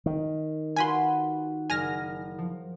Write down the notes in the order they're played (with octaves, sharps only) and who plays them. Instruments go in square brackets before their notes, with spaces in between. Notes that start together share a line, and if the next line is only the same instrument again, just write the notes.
[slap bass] D#3
[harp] F4 F#4 B4 [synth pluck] G#5 B5 C6
[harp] F#1 [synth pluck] G#5 F6 A#6
[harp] F3